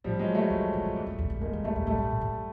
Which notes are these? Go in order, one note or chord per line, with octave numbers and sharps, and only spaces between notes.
A2 F3 G3
F#3 G#3
G3 A3
F2
F2
F2
E2
F2
F2
E2
F2 G#3 A#3
E2
E2 G3 A3
F2
F#2 G3 A3
G2
G#2
G2